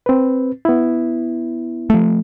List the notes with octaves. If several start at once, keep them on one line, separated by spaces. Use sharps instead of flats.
C4 B4
B3 E4
F3 A3